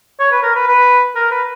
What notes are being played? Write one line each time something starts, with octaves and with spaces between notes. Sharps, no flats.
C#5
B4
A#4
B4
B4
A#4
B4